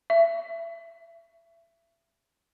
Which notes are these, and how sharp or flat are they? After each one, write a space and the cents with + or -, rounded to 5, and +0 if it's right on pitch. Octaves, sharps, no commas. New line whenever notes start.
E5 +25